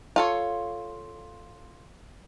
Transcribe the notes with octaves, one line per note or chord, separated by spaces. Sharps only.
F4 A4 C#5